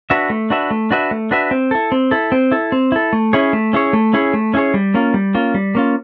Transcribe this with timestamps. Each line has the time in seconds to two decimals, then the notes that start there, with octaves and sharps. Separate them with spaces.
0.10 D4 F#4 B4 E5
0.30 A3
0.50 D4 F#4 B4 E5
0.71 A3
0.91 D4 F#4 B4 E5
1.11 A3
1.31 D4 F#4 B4 E5
1.51 C4
1.71 E4 A4
1.92 C4
2.11 E4 A4
2.32 C4
2.52 E4 A4
2.72 C4
2.92 E4 A4
3.13 A3
3.33 C#4 E4 G#4 C#5
3.53 A3
3.73 C#4 E4 G#4 C#5
3.93 A3
4.13 C#4 E4 G#4 C#5
4.34 A3
4.54 C#4 E4 G#4 C#5
4.74 G3
4.94 A#3 C#4 F4
5.14 G3
5.35 A#3 C#4 F4
5.54 G3
5.75 A#3 C#4 F4